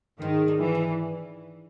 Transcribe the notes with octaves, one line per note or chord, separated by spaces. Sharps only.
G#2 D#3
D4
E3
D4